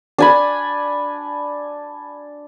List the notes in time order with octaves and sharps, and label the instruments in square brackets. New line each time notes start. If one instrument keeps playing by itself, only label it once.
[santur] D4 G#5 B5